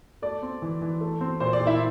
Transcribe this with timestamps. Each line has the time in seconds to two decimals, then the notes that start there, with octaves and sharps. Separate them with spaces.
0.22 A3 D5
0.42 C4
0.62 E3
0.81 E3
1.01 A3
1.21 C4
1.40 A#2 C5
1.53 D5
1.60 A#2
1.67 E4 E5